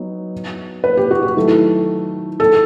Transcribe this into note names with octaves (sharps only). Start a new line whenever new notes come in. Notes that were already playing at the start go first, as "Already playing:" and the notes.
Already playing: F#3 B3 D#4
B4
G4
F#4
G4
D#3 F#3 A3 E4
A4